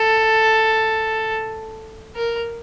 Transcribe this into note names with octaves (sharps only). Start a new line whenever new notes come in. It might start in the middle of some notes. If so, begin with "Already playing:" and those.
Already playing: A4
A#4